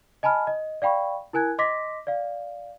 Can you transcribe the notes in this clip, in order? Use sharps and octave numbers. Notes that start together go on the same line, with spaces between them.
D#5 G#5 A5 B5 F6
D#5
D5 F5 G5 B5 C#6
E4 A#4 G#5 F#6 G#6
D#5 C6 D6 A#6 B6
D5 F5